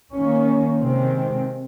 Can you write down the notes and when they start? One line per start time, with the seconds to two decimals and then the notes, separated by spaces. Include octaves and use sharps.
0.13 D#3 A#3 C#4
0.79 C3 D#3 G#3 C4